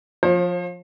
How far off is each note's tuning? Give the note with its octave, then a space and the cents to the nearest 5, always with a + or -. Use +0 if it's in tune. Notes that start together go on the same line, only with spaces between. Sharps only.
F3 +15 C5 +45